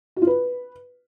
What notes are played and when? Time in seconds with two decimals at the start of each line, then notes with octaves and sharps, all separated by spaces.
0.16 F#4
0.22 F4
0.27 B4